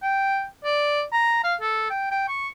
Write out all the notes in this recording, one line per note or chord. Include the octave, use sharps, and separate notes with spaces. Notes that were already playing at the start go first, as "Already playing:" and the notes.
G5
D5
A#5
F5
A4
G5
G5
C#6